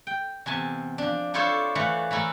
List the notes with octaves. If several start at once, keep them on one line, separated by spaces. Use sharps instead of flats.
G5
E2 C3 G#5 A5
F3 D4
D4 E4 F4 A4 C5 C#5
E3 A3 F4 F#5
E3 A3 E4 A4 A#4